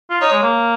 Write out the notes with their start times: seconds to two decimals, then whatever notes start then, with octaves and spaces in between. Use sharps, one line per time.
0.10 F4
0.21 D#4 C#5
0.32 G#3
0.42 A#3